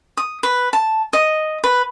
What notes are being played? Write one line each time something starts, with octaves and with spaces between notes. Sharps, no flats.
D#6
B4
A5
D#5
B4